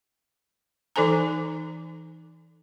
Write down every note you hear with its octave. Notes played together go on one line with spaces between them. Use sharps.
E3 D#4 A4 C5 G#5 A#5